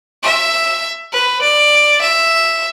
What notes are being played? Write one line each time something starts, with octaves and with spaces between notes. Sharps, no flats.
E5
B4
D5
E5